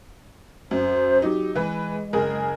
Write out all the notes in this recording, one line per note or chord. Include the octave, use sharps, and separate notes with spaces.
F#2 C5
F#3 D#4 G4
E3 G#3 B4
F#1 G#4 A#4